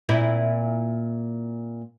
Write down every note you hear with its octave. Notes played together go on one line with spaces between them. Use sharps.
A#2 C4 E4